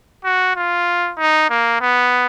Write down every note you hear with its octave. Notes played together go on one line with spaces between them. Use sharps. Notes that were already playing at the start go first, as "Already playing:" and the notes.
F#4
F4
D#4
A#3
B3